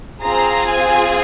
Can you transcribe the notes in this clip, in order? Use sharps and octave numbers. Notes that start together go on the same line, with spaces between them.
C4 F4 G#4 A#5
G#5